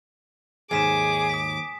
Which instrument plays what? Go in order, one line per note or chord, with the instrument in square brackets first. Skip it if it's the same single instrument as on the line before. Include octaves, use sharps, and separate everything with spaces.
[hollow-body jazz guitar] D#2 G#2 [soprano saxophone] G#4 [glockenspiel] G#5 B6 E7 [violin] D6
[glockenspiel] D#6 B6